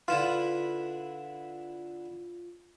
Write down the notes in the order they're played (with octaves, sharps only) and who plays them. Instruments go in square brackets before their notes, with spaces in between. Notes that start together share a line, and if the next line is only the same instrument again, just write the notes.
[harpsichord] D3 E4 B4 [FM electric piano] F4